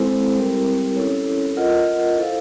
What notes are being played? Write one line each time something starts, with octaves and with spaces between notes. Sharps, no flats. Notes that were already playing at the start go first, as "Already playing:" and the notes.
Already playing: G#3 C4 E4 A4 C5
G3 C4 E4 G4 A#4
C#4 E4 A4 C#5
F4 A#4 D#5 F#5
E4 A4 C5 F5